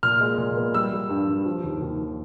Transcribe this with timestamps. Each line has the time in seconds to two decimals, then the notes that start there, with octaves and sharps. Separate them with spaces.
0.03 A#2 F6
0.21 G#3
0.38 A#2
0.57 B3
0.74 G3 E6
0.93 G3
1.10 G2
1.28 G2
1.46 F3
1.64 D#2
1.82 D#2